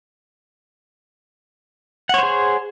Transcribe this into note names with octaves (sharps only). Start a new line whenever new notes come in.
G#4 C5 C#5 F#5